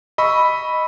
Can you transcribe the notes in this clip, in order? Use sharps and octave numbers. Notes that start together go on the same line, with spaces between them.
D#5 B5 C#6 E6